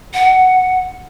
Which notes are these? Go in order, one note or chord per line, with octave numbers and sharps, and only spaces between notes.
F#5